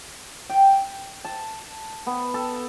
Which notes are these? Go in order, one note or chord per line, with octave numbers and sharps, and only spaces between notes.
G5
A5
B3
A4